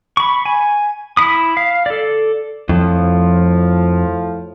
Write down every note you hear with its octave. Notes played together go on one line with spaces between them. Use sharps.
B5 C#6
G#5
E4 B5 D#6
F5
A4 D5
F2 A2 F3